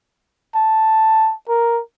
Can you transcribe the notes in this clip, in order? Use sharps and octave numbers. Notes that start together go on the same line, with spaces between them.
A5
A#4